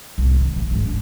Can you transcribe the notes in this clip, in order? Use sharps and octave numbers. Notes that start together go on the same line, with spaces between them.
C2 A2
D#3
A#1 G2
G#1 G2
D4